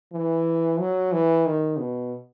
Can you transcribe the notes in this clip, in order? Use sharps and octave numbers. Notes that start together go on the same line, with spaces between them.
E3
F#3
E3
D#3
B2